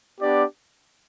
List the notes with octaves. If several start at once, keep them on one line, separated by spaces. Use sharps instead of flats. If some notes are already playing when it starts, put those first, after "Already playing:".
B3 D4 G4 D5